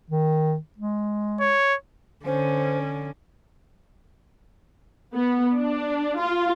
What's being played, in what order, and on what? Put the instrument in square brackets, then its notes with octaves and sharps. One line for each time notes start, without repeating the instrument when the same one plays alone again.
[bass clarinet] D#3
G#3
[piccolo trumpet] C#5
[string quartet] D3 [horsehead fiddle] C#4 [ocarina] C5
[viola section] B3
D4
F4